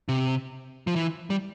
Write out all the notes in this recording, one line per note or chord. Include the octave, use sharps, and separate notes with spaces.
C3
F3
E3
G3